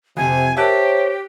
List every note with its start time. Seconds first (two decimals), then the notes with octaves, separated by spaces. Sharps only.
0.17 F2 C3 G#5
0.57 G4 A#4 C5 C#5 E5 A5 F#6